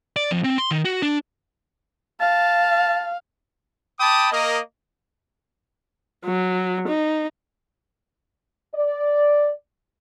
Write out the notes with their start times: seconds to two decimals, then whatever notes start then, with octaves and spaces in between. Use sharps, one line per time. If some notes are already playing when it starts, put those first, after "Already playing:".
0.16 D5
0.31 F2
0.44 C4
0.58 C6
0.71 D#3
0.85 F#4
1.02 D4
2.20 F5 A5
3.99 G5 A5 B5 D6 D#6
4.31 A#3 A#4 D#5
6.26 F#3
6.88 D#4
8.74 D5